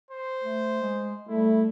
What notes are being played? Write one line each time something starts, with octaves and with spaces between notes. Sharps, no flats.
C5
A3
G#3
G3 A3 E4